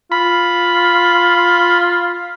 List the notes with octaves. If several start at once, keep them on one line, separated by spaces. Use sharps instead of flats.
F4 B5